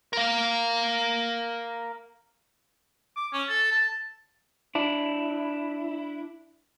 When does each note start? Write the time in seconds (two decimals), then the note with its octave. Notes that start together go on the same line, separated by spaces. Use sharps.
0.13 A#4 F5
3.16 D6
3.33 C#4
3.49 A4
3.72 A5
4.75 D4 E4